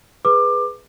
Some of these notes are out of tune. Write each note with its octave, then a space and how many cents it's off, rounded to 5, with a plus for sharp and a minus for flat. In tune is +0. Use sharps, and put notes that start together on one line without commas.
G#4 +0 B4 +0 D6 +20